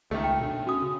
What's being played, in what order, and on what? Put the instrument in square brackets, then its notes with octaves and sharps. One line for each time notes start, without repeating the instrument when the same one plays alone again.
[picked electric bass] C#2 [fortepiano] D#3 A3
[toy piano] G5
[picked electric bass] B2 D4
[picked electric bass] C#4 [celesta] F#4 D#6
[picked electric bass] C#3